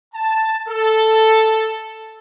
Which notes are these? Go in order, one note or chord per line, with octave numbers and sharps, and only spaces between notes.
A5
A4